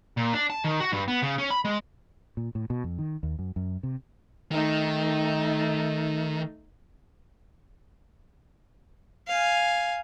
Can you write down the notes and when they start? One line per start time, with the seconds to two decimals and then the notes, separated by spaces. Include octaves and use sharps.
0.17 A#2
0.33 D4
0.50 A5
0.64 D#3
0.80 F#4
0.92 G2
1.08 B3
1.22 C#3
1.38 C#4
1.50 B5
1.65 G#3
2.37 A#2
2.55 A2
2.70 B2
2.84 F2
2.99 D#3
3.23 D#2
3.39 F#2
3.56 F#2
3.83 C3
4.51 D#3 A3 D#4
9.28 F5 G#5